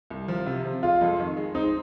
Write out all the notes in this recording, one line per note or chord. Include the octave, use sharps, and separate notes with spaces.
C2
F3
C3
F3
G#3 F4
F2
D#3
G#3
C4 D#4